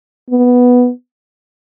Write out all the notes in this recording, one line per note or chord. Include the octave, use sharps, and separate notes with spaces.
B3